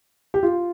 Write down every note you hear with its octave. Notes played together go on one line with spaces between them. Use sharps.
G4
F4